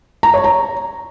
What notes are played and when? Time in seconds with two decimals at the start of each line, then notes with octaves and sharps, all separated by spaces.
0.23 A#5
0.34 C#5
0.44 A#5